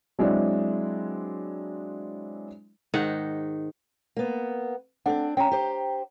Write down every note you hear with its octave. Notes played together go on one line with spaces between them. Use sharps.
F#3 G#3 C4 D4 E4 G#4
G#2 D#3 D#4 F#5
A#3 B3
C4 D4 A4 F#5
C#4 G5 A#5
G4 C5